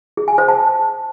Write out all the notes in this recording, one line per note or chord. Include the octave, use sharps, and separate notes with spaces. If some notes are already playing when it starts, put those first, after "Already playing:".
G#4
G#5
C5
A5